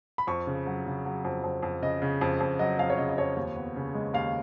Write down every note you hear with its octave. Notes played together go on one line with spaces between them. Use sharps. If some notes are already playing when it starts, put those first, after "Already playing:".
B5
F2 C#6
C#3
F#3
C#3
F#3
F2
F2
F2
C#3 D#5
C#3
F2
F2
F#3 D#5
F2 F5
C#5
C#3 D#5
D#5
F2 C#5
D#2
B3
C#3
G#3
D#2 F5